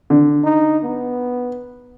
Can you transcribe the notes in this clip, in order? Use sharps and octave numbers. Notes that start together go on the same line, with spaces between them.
D3
D#4
B3